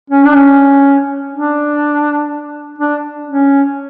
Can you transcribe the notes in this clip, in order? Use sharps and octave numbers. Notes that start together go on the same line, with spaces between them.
C#4
D4
C#4
D4
D4
C#4